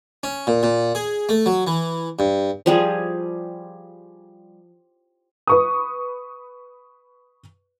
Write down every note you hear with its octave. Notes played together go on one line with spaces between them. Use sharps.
C#4
A#2
A#2
G#4
A3
F#3
E3
G2
F3 G3 G#4
B4 C#6 D#6